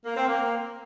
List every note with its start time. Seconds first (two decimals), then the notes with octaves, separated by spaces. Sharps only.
0.05 A#3
0.17 C4
0.28 A#3